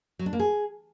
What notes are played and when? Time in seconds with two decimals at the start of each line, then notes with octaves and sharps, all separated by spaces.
0.19 F#3
0.26 D4
0.33 A#3
0.39 G#4